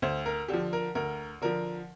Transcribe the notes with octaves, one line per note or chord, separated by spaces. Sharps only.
D2 C5
A#4
D3 F3 G4
A#4
D2 A#4
D3 F3 A#4